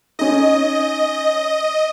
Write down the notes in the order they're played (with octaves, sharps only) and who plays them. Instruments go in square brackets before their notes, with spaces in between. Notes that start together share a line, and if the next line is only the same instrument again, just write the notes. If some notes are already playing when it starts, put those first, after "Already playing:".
[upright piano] C#4 D#4 [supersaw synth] D#5